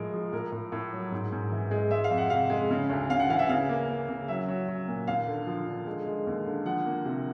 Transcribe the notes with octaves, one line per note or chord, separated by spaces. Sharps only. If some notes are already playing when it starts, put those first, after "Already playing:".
Already playing: A2 F3 G#3 A#4
F3
A2 A#4
A2
A2
F#3
G#2
G#2
E3
G#3
G#3 E5
F5
F2
F#5
C3 F5
G#3
C#3
D2
C#3 F5
F#5
E3 F5
E5
C#3 F5
A#3
A#3
C#3
F#3 E5
F#3
F#3
A#2
D#2 F5
D3
F3
D3
G#3
G#3
D#2
D3
F3 F#5
A#3
C3